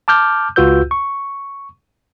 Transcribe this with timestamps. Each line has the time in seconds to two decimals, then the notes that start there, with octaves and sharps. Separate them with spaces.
0.08 A5 D6 F6 G6
0.56 C#2 F4 F#4 B4 E6 G6
0.91 C#6